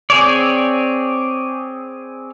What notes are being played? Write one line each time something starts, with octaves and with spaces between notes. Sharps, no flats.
C4 G#4 C#5 D5